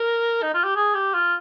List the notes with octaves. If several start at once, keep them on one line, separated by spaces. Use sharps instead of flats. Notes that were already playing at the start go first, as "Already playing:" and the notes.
Already playing: A#4
D#4
F4
G4
G#4
G4
F4